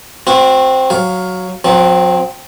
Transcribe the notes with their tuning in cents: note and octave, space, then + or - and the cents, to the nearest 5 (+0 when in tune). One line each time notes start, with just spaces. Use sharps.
C4 +0 F#4 -35
F#3 +0 F5 +15
F#3 -45 C4 +0